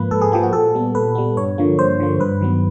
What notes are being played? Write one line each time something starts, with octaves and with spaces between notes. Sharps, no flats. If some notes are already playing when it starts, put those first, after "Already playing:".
Already playing: G#2 F3 A#3 B4
G#2 A4
G#4
F3 A#3 G4
F#4
A#2 A4
G3 B3
A#2 B4
G3 B3
G2 C#5
D3 F3 A#3
G2 C5
D3 F3 A#3
G2 B4
D#3 F#3 B3